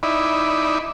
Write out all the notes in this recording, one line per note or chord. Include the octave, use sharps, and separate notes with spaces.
D#4 E4 D5 B5